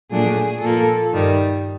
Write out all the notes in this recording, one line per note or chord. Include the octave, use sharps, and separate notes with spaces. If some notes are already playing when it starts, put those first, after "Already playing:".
A#2 F#3 A3 D4 G#4
A#2 F3 A#3 A4
G2 D#3 G3